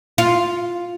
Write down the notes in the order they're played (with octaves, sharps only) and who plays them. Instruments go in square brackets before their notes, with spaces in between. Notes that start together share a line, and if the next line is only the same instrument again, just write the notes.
[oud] F4